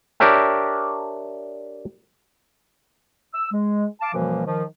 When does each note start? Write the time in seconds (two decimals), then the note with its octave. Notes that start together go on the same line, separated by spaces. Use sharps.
0.20 D4 G4 A#4 C#5 E5 G5
3.34 E6
3.52 G#3
4.01 F5 A5 D6
4.14 F#2 B2 E3 F3 G3 A#3
4.46 D#3 F3